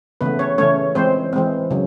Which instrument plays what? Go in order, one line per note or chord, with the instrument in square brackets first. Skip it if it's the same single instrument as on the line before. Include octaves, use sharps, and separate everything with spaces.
[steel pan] C#3 E3 A3 B3 B4
C#4 C#5
C#3 E3 A3 C#4 C#5
E3 G#3 C4 C5
E3 G#3 C4
C#3 F#3